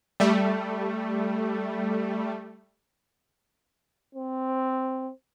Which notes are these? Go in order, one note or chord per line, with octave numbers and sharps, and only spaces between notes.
G3 A3
C4